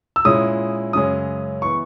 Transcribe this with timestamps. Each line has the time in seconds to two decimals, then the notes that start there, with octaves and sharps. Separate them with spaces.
0.16 E6
0.25 A#2 G#3 C#4 E4 D#6
0.93 F#2 C#3 G#3 C#4 D#6
1.62 E3 B3 C#6